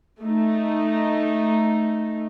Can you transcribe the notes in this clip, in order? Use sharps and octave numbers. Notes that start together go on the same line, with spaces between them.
A3 D#4